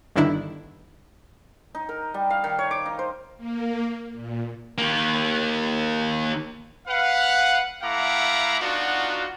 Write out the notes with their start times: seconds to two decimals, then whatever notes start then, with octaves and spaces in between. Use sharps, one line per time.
0.16 G1 G2 D3 D#3 D4 E4
1.75 D#4
1.89 A#4
2.14 G3
2.30 F5
2.44 D#3
2.59 C#5
2.71 D6
2.86 D#4
2.99 C5
3.37 A#3
4.12 A#2
4.78 D#3 A#3
6.87 B4 F5 F#5
7.82 A3 E4 F5 F#5 A#5 D6
8.60 B3 D4 D#4 F4 F#4